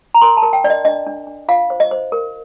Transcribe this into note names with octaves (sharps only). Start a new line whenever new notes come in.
A#5
A#4 C6
A5
A#4
G5
D4 D5
D#5
D4 D#5
D4
D4
F4 F5
C5
D#5
C5
A#4